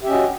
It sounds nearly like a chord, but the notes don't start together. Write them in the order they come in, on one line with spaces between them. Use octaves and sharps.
G4 E5 C#4 D#5 F#4